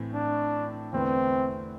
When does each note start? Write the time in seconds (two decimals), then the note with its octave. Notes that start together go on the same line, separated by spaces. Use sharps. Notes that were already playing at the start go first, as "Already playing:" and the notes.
Already playing: A2 E3 A3 C4
0.14 D4
0.93 E2 D3 A3 C4 E4 B4